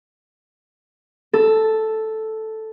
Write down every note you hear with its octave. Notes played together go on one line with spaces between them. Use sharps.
A4